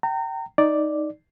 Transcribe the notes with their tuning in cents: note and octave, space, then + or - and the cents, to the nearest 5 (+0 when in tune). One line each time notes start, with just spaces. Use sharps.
G5 -25 A#5 -30
D#4 +0 D5 +0